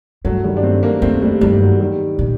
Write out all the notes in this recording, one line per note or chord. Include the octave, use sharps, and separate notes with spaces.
G2 F#3 A3
D#3 G3
D4
A3 C4
A#3 D4
F#2 A3 C4
G3 A#3
G2 D#3 G3
F#3
D#3 G3
A#2